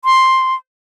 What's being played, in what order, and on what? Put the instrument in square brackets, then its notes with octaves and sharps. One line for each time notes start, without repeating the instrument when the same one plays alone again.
[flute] C6